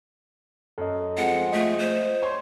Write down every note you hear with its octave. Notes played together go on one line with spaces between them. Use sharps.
F#2 A4 D#5
F3 G#3 C4 F#5
A3 F4 D#5
C5
C#5 C6